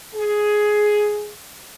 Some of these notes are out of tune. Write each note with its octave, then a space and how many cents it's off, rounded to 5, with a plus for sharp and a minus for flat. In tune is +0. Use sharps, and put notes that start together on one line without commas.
G#4 +10